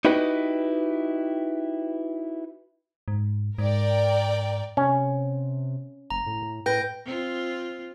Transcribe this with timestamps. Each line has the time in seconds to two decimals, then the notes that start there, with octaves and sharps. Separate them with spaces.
0.05 D#4 E4 F#4 G4 B4 D#5
3.08 G#2
3.58 G#2 A#4 D5 G5
4.77 C3 C#4
6.10 F#1 A#5
6.26 A2
6.66 A2 B4 G5 G6 A#6
7.05 C4 F4